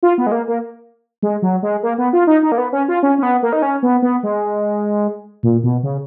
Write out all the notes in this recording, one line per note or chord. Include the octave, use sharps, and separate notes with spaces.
F4
B3
G#3
A#3
A#3
G#3
F#3
G#3
A#3
B3
F4
D#4
D#4
A#3
B3
C#4
F4
C#4
C#4
B3
A#3
D#4
C#4
B3
B3
G#3
A#2
B2
C#3